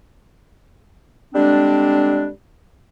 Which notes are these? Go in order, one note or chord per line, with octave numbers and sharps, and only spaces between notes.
D3 G3 G#3 C4 D4